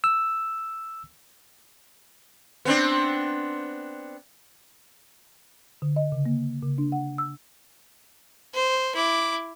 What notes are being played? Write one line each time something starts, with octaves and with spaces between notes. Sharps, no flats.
E6
B3 C4 D4
D3
D#5
C#3
A#3
C#3
D4
F#5
E6
C5
E4 D6